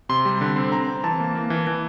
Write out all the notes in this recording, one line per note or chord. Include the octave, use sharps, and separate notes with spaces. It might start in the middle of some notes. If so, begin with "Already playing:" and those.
C3 C6
G3
D3
C4
C4 A#5
C4
E3 A5
A#3
A#3
E3
E3